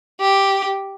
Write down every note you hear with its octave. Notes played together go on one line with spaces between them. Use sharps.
G4